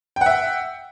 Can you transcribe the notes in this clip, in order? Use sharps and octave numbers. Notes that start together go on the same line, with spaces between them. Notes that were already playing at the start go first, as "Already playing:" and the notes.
E5 F#5 G5